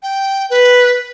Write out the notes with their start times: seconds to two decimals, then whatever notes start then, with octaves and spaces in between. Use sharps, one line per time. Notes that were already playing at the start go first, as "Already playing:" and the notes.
0.03 G5
0.50 B4